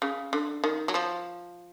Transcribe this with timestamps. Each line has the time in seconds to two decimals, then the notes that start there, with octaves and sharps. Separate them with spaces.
0.02 C#3
0.33 D3
0.64 D#3
0.88 F#3
0.94 F3